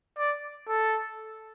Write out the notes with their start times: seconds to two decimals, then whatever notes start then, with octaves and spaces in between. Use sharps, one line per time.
0.18 D5
0.68 A4